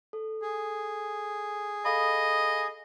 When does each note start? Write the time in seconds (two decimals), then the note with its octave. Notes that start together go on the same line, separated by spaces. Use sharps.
0.13 A4
0.42 G#4
1.85 A4 D#5 F5 B5